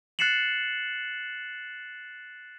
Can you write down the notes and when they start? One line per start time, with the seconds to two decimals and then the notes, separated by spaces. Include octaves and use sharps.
0.19 F#6 A6 C7 C#7 E7 F#7